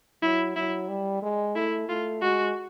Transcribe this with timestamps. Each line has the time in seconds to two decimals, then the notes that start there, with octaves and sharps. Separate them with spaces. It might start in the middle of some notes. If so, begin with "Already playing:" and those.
0.22 F#3 E4
0.56 F#3 E4
0.89 G3
1.22 G#3
1.56 A3 E4
1.89 A3 F4
2.22 G#3 F#4